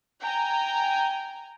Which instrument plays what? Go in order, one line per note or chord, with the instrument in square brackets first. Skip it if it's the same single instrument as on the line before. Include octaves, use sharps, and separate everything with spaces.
[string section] G5 G#5 A#5